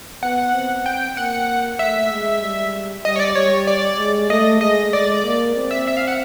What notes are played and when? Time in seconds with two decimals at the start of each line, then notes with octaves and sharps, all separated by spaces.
0.23 B3 F#5
0.54 C4
0.86 G5
1.17 A#3 F#5
1.79 A3 E5
2.11 G#3
2.42 G3
3.05 G3 D#5
3.16 C#5
3.20 D5
3.35 G3 C#5
3.67 D5
3.98 G#3
4.30 A3 D#5
4.61 G#3 D#5
4.93 G#3 D5
5.24 A#3
5.56 C4
5.71 E5
5.87 E5
5.97 F5
6.07 F#5